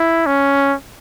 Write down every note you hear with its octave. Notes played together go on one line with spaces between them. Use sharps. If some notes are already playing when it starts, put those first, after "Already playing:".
Already playing: E4
C#4